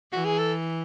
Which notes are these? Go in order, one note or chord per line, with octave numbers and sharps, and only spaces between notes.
E3 F#4
G#4
A4